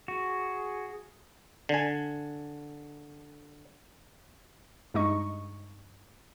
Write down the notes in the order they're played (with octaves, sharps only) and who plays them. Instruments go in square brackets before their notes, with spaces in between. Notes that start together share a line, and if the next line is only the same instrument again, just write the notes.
[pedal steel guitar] F#4 [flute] G#4
[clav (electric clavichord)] D3 G#5
[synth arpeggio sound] G2 G#3 D#4 D#5 C#6